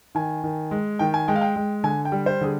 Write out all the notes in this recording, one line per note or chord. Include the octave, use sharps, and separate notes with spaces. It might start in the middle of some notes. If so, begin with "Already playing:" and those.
D#3 G#5
D#3
G#3
D#3 G5
G#5
G#3 G5
F5
G5
G#3
D3 G#5
G5
G3
C5
D3 G#4